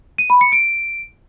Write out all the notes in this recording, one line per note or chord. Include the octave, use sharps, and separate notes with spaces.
D#7
B5
C#7
D7